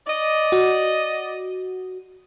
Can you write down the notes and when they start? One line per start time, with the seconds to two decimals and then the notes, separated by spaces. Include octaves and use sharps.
0.07 D5 D#5
0.52 F#4